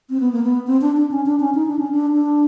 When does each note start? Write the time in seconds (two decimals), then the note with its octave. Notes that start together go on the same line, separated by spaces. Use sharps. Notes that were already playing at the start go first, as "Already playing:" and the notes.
0.10 C4
0.20 B3
0.32 A#3
0.43 B3
0.67 C4
0.81 D4
0.97 D4
1.11 C#4
1.26 D4
1.40 C#4
1.55 D#4
1.67 D4
1.79 C#4
1.91 D4
2.12 D4